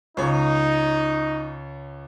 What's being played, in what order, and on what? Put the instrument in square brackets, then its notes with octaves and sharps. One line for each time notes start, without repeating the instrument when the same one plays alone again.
[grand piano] C#2 C#5 [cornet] D#4